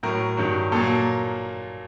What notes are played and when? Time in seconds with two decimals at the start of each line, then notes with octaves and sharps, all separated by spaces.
0.03 A2 F#3 A#4
0.37 G2 D#3 F#3
0.72 A#2 F#3 A4
0.83 A#3